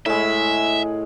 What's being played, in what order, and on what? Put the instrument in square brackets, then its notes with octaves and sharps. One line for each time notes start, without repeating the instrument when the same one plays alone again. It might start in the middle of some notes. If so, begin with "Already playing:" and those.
[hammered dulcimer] A2 G#3 [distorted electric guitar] E5